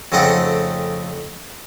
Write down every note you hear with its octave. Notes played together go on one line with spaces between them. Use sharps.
F2 C#3 A3 C4 D#4 F#5